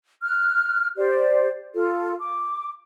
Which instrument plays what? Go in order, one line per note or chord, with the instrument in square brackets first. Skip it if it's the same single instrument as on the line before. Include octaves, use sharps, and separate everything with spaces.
[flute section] F6 F#6
G4 C5 D5
F4 A4
D6